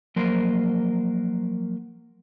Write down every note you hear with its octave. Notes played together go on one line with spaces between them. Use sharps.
F3 F#3 A#3 A#4 C5